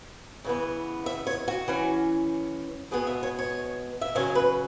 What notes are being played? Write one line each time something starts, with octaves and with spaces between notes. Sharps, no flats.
C#3 E3 B3
E5
C#5
F#4
E3 C#4
B2 G#3 B3 G#4
E5
C#5
C#5
E5
C#3 F#3 C#4 C#5
B4